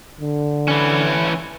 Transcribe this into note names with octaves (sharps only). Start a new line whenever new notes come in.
D3
E3 C#4